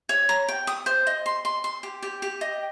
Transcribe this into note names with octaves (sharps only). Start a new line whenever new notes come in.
C#5
A#5
G5
D#6
C5
D#5
C6
C6
C6
G4
G4
G4
D#5